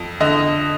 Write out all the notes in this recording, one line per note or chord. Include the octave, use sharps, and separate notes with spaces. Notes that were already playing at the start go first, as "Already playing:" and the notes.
Already playing: F2
D3 D#5